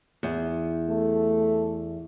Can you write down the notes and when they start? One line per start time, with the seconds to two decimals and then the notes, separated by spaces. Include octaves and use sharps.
0.23 E2
0.89 A3